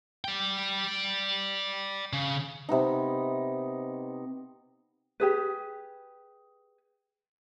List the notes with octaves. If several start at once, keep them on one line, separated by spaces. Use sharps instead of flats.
D5 G5
C#3
C3 B3 D#4
G4 G#4 B4